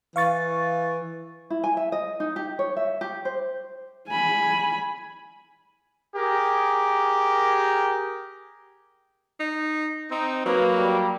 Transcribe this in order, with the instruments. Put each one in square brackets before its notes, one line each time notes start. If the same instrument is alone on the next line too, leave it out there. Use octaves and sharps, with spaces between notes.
[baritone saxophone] E3 [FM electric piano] F5 C#6 A6
[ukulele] E4
G#5
E5
D#5
D#4
G4
C#5
E5
G4
C5
[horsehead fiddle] G#5 B5
[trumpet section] G4 G#4 A#4
[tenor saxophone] D#4
[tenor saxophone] C4 [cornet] D#4
[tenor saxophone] F#3 [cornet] A#3 [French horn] B4
[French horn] G3